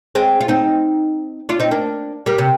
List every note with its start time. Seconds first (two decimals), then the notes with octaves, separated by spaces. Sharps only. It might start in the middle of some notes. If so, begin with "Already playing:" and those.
0.15 G#3 C4
0.41 F4
0.48 C4 D#4
1.49 D4 F4
1.60 C4 D#4
1.71 A#3 D4
2.26 G3 A#3
2.38 C3